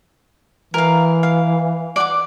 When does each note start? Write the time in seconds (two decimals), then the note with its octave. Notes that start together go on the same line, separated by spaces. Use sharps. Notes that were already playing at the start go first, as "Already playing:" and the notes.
0.74 E3 A#4 F5
1.23 F5
1.96 D5 F#5 D6